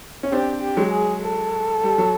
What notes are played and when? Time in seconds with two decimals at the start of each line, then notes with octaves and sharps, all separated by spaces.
0.23 C#4
0.32 C4 D4 G4
0.62 G4
0.77 F#3 G#3
0.91 G#4
1.22 A4
1.83 G3
1.98 F#3